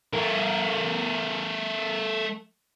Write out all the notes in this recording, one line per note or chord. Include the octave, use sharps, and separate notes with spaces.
A3 A#4